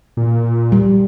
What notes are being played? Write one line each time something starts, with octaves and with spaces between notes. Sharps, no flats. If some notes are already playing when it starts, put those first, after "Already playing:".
A#2
G3